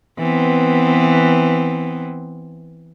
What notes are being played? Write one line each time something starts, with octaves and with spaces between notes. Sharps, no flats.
E3 B3 C4